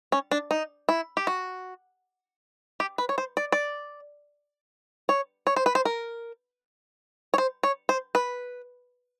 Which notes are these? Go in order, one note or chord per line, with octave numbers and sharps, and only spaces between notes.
C#4
D4
D#4
E4
G4
F#4
G4
B4
C#5
C5
D5
D5
C#5
C#5
C5
B4
C5
A#4
C#5
C5
C#5
C5
B4